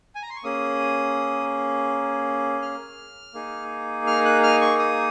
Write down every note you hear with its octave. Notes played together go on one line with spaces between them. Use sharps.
G#5
A#5
C6
C#6
A#3 C#4 G#4 D#6
F6
A#3 D#4 G#4
F6
F#6
F6
C#6
D#6